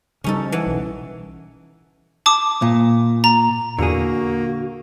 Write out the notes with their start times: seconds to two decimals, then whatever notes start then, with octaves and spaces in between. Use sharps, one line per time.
0.24 C#3 G3 C#4 D#4 A4
0.52 E3 F#5
0.67 B1
2.26 A5 D6 D#6
2.62 A#2
3.24 A#5
3.79 E2 A#2 D3 A#3 F#4 G#4